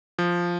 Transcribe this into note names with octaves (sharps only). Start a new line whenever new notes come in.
F3